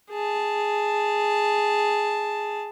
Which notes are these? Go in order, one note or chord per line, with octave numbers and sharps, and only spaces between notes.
G#4 A5